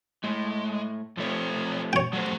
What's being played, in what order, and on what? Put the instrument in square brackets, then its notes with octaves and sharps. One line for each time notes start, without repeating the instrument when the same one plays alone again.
[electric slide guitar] A2 [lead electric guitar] G#3
[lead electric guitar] B1 C#5 [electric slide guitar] F3 A3 C4
[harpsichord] C#5 G5
[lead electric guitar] F3 F#5 [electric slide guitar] F#3 A3 C5